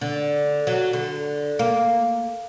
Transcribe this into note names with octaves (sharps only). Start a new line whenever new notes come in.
D3
F#3
D3
A#3